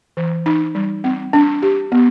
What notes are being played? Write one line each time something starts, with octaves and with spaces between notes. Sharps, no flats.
E3
D#4
G3
C4
D4
G4
B3